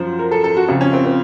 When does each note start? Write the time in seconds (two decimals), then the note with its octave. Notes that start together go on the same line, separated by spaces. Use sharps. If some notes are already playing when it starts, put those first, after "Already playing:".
Already playing: F#2 F3 C5
0.19 A#4
0.31 A4
0.44 A4
0.57 F#4
0.68 F2 C#3 F3
0.81 C#4
0.93 C4
1.05 C4